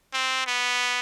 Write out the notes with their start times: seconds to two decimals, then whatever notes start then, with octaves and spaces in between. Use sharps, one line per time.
0.13 C4
0.47 B3